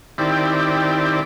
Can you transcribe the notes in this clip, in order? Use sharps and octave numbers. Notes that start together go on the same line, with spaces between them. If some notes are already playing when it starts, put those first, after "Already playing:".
D#3 C4 E4 G4 D5